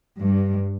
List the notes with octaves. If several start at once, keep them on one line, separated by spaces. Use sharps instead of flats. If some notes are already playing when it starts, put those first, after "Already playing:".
G2